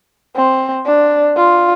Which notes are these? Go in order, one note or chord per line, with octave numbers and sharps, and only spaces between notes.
C4
D4
F4